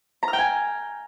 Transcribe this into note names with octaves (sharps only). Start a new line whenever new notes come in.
A#5
F6
G5
G#5